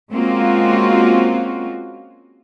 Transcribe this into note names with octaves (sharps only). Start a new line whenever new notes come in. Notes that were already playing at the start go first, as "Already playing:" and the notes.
G#3 A#3 C4 C#4 F4 F#4